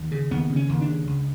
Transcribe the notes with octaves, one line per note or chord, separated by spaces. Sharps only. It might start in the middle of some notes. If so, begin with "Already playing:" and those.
Already playing: D#2
C#3
D#2 B3
C#3
C#4
D#2
D4
C#3
C#2